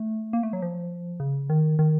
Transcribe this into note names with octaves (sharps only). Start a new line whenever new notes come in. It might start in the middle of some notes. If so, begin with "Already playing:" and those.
Already playing: A3
A#3
A3
F#3
F3
C#3
D#3
D#3